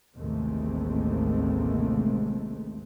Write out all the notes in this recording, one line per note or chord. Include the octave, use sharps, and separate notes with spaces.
A1 D#2 C3 G#3 A3 C4